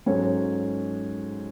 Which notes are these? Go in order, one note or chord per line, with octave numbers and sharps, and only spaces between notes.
G#2 F#3 C#4 A4 C#5